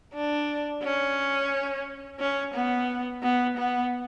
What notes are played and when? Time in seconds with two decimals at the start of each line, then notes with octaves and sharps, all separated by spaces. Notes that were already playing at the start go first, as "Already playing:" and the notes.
0.14 D4
0.83 C#4
2.19 C#4
2.54 B3
3.23 B3
3.57 B3